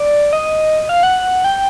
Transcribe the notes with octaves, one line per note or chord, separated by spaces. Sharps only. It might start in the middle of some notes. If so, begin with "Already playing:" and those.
Already playing: D5
D#5
F5
F#5
G5